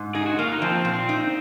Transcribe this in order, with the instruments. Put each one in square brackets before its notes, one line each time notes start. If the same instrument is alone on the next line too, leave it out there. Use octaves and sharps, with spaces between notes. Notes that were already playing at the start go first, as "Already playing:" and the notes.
Already playing: [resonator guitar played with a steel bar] G#2
[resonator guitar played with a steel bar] D#4 [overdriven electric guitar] G#4
[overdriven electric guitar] F#4
[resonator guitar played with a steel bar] A#3 [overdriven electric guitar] F4
[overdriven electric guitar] D#4
[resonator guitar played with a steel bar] F3 [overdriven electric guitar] C4
[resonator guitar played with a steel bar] A#2
D#4